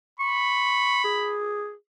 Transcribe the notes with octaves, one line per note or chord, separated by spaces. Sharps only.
B5 C#6
G#4